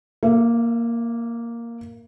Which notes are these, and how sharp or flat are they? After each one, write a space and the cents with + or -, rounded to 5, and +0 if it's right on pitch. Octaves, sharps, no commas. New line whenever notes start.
A#3 +0 E5 +40